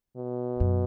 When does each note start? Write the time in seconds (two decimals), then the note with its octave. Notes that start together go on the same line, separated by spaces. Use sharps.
0.17 B2
0.60 F#2